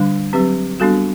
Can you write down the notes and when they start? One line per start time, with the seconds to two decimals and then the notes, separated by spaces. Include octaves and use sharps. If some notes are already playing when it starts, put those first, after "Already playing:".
Already playing: D3 G3 D4
0.33 F#3 C4 G4 B4
0.80 G3 B3 D4 F#4 A4